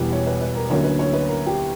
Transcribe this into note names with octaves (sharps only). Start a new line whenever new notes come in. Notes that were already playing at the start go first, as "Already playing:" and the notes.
Already playing: E1 E2 B2 G3 G4 B4
C#5
B4
B4
A#4
D2 D3 F#3 A#3 C#4 C#5
B4
C#5
B4
A#4
G4